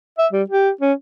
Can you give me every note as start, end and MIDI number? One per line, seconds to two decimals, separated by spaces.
0.18 0.27 76
0.32 0.43 55
0.50 0.70 67
0.81 0.93 61